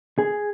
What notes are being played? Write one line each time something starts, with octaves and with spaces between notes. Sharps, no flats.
G#4